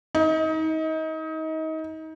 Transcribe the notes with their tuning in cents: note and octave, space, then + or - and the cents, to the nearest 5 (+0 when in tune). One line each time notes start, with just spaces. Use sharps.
D#4 +30